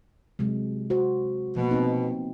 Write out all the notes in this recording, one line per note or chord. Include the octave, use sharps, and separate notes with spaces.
C3 F#3 G#3
F#4 C5
B2 F3 A#3
B3 C4 D#4